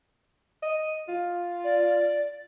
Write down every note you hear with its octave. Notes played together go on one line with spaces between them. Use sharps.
D#5
F4
D5